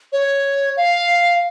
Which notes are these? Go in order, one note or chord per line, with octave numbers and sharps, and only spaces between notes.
C#5
F5